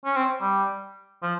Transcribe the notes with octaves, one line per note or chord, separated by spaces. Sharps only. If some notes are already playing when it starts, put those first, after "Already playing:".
C#4
C4
G3
F3